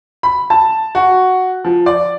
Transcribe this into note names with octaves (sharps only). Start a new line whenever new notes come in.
B5
A5
F#4
F3
D5